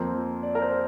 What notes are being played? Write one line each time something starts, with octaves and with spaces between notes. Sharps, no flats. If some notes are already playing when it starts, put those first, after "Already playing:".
Already playing: F2 F3 A#3 C5
D5
A#4
C5